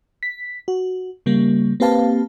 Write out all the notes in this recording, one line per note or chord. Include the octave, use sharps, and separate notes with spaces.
B6
F#4
C#3 G3 A#3
A#3 C4 G4 B4 F5 A5